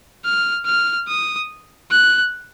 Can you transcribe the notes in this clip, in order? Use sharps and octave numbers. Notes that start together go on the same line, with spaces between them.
F6
F6
D#6
F#6